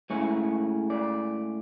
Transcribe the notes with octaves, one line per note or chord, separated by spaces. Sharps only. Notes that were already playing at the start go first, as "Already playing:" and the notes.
A2 G#3 C#4 C#5
D5